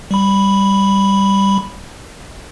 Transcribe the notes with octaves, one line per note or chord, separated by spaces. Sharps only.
G3 B5